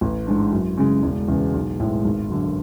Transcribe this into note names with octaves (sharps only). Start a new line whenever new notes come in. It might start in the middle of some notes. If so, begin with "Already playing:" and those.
A1
G#2 G#3 D4
F#2
C#3 G#3
E1
E2 C#3
B1
A2 G#3
G#1
F#2 D3